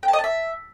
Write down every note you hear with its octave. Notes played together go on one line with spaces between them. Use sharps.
G5
A5
D#5
A5
E5